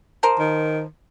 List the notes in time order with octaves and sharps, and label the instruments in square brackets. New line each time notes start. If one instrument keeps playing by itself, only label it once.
[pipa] F3 A#4 C5
[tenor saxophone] D#3